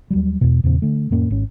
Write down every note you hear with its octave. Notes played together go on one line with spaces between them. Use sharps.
D#2 F#3 G3
E2 B2
E2 A#2 C#3 C4
D3 A3
F2 A2 A#3 C#4
G#1 C#4